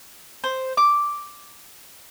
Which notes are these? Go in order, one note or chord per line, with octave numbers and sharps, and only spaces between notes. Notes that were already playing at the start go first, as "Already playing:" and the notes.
C5
D6